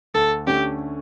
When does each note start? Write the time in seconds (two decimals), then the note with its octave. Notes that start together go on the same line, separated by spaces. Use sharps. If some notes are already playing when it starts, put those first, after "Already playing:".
0.14 D2 A4
0.47 D3 A3 C#4 G4